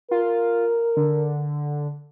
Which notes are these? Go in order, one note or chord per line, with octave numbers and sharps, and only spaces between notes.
F4 A#4
D3